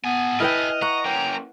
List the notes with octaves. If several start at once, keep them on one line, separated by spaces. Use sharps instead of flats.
B3 A4 G#5
E4 B4 D#5 G5 F6
F#5 A#5 C#6
A#3 C#4 G5